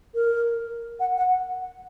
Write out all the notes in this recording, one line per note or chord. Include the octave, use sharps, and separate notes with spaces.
A#4
F#5
F#5